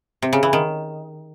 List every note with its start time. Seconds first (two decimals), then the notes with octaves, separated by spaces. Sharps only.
0.22 C3
0.33 C#3
0.43 E3
0.53 D#3